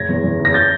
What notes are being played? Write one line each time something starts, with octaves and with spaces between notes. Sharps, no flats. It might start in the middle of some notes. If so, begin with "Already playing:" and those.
Already playing: F#1 G#6 A#6
E2
E2
F#1
A#6
G6 A6